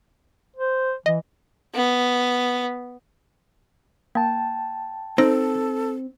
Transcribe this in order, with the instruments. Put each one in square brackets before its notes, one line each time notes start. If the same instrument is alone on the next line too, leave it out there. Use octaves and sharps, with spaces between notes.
[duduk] C5
[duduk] E3 [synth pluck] D#5
[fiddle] B3
[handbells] A#3 [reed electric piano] G5 A5
[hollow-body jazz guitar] C4 [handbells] D#4 C5 A#6 [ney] A4